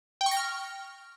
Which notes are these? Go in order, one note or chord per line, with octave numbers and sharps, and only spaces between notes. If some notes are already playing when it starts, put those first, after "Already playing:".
G5
C#6
A#6
F6